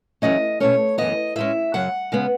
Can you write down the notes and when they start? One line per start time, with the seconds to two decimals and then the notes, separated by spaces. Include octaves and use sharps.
0.22 E2 C#3 F#3 A3 C#4 D#5
0.60 B2 A3 C#4 C#5
0.98 F#2 E3 B3 D#5
1.36 A2 G#3 C#4 E5
1.74 F#2 C#3 F#3 F#5
2.12 C#3 G#3 B3